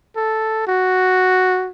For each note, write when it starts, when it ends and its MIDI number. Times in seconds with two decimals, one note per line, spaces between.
0.16 0.65 69
0.67 1.71 66